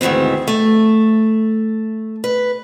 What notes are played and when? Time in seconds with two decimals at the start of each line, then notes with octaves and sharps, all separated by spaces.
0.01 D2 G#2 D#3 E3 C4
0.48 A3
2.24 B4